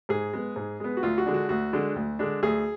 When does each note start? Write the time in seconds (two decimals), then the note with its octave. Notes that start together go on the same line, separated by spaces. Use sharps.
0.09 G#2 G#4
0.33 G#3 B3
0.56 G#2
0.80 G#3 B3
0.97 F#4
1.03 D2 F4
1.18 F#4
1.26 D3 G#3 D4
1.34 F#4
1.49 D2 F#4
1.73 D3 G#3 D4
1.96 D2
2.19 D3 G#3 D4
2.43 D2 G#4